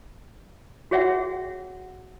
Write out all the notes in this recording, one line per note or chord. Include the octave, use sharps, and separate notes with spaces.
F#4 G#4 C#5 E5 F#5 G5